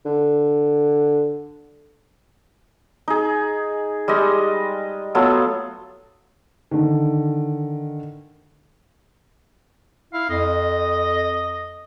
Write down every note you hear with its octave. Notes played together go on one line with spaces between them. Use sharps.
D3
D#4 G#4
G3 G#3 D#5
F#3 A3 B3 F4
D3 D#3
E4 F5
F2 D#5